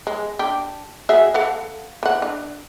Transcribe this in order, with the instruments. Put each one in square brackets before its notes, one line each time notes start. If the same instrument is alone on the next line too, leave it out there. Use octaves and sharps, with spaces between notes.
[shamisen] G#3
D4 G4
F#4 G#4 E5
A4 F5 F#5
E3 F#5
D4